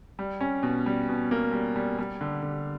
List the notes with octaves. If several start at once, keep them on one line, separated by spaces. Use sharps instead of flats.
G3
C#4
B2
G3
B2
A#3
G3
G3
G3
D3
D3